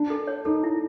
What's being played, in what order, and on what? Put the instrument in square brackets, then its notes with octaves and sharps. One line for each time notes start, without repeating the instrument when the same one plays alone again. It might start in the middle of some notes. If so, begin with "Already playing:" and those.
Already playing: [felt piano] D4
[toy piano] A4
C#5
[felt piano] D#4 [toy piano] A4
[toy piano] E4